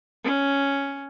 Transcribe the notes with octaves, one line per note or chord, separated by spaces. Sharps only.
C#4